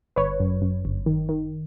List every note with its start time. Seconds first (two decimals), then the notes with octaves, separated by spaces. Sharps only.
0.16 G1 B4 C#5
0.40 F#2
0.62 F#2
0.85 G1
1.06 D#3
1.29 D#3